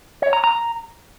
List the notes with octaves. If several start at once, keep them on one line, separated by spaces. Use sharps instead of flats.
C#5
A#5
A#5